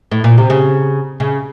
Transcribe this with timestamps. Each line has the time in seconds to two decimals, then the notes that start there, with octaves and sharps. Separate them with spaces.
0.11 A2
0.24 A#2
0.38 C3
0.50 C#3
1.20 C#3